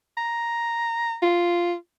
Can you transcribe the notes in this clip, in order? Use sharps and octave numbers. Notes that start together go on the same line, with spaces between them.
A#5
F4